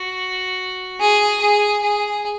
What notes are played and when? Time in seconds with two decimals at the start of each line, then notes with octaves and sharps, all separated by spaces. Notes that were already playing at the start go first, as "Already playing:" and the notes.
Already playing: F#4
1.00 G#4
1.41 G#4
1.83 G#4